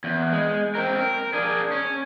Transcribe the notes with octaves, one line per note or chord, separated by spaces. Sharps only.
E2
G#3
C4 A#4
A#4
D4 G#4
C#4